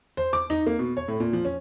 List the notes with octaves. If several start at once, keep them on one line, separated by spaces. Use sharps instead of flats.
C5
D6
D#4
A#3
B2
C#5
A2
A#2
F3
C#4